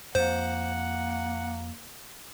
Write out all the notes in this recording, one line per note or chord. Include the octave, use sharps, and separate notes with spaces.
F2 A#3 C5 F#5